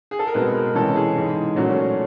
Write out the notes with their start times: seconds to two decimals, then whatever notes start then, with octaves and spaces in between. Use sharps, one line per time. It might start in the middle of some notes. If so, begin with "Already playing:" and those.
0.11 G#4
0.19 A4
0.27 A#4
0.34 B2 G#3 C4 B4
0.54 A#4
0.75 C3 E3 G#3 C#4 A4
0.95 G#4
1.16 G#2 E3 G#3
1.56 A#2 F#3 A3 C#4